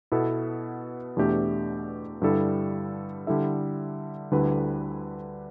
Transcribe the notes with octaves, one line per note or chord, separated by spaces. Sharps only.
B2 B3 E4 A4
E2 B2 A3 D4 G4
G2 D3 G3 E4 A4
D3 G3 E4 A4 E5
D2 D3 G3 E4 B4